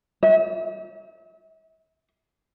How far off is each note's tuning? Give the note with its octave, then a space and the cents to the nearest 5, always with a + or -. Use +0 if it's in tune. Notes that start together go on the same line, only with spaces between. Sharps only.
E5 -40